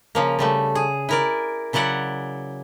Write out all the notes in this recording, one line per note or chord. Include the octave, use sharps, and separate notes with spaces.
C#3 F3 A#3
C#3 G3 A3
G#4
E4 A#4 D5
C#3 F#3 E4 D5 F#5